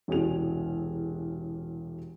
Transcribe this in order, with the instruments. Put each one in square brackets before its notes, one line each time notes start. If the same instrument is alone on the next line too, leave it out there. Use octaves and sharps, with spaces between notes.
[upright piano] E1 C2 C#4 F#4 G#4 F7